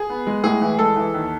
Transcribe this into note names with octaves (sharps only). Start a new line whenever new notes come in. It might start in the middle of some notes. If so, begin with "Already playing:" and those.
Already playing: G#4
B3
G#3
A2 G#4
E3
G#3 A4
E3
D#2